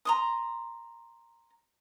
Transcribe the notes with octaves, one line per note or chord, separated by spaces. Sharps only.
A#5 C6 D#6